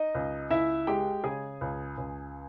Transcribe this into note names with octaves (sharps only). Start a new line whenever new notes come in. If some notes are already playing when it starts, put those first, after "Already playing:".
Already playing: D#4 D#5
C#2
C#2 E4 E5
G#3 G4 G5
C#3 G#4 G#5
C#2
C#2